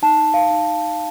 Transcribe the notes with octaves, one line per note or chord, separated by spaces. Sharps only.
D#4 A5
F5
D#4